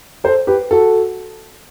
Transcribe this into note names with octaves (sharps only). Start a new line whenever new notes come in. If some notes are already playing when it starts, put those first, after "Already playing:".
A4 C5
G4 B4
F#4 A4